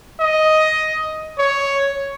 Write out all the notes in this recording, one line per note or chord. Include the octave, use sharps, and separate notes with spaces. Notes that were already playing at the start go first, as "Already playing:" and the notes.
D#5
C#5